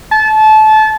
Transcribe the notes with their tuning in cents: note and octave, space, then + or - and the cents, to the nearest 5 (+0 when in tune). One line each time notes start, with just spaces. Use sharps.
A5 -25